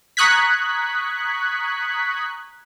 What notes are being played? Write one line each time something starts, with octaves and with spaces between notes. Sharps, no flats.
A#5 C#6 D#6 F#6 G#6 B6